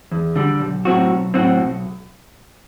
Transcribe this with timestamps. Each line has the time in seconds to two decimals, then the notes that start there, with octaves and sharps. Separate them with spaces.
0.12 E2
0.36 D3 G3
0.60 B1
0.85 A2 F#3 C4 F#4
1.10 B1
1.34 A2 F#3 C4 F#4
1.59 B1